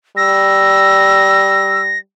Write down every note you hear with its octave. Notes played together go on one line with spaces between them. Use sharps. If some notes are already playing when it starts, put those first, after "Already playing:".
G3 E6 A#6